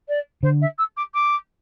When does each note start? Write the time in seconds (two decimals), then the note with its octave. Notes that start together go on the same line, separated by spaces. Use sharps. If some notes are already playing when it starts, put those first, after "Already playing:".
0.08 D5
0.43 D3 C5
0.61 E5
0.78 E6
0.96 D6
1.14 D6